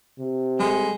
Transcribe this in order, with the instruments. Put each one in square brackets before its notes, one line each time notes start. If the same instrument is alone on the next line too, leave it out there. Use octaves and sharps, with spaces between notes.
[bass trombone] C3
[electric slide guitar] G3 A4 [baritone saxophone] G#3